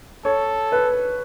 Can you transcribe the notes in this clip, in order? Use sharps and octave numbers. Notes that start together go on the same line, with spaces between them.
A4 C#5
B4